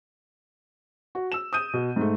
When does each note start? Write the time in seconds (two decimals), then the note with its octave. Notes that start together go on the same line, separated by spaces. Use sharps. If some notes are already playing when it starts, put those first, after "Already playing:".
1.15 F#4
1.32 E6 E7
1.53 D#6 G6 D#7
1.73 B2
1.96 G#2 A3